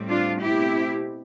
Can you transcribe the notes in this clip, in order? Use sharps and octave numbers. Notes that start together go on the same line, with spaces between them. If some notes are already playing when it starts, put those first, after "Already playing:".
Already playing: A2 G3 C4
D4 F4
B2 A3 C4 E4 G4